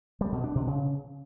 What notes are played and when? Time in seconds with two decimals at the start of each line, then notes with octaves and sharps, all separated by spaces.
0.21 G3
0.32 B2
0.44 D4
0.55 B2
0.67 C#3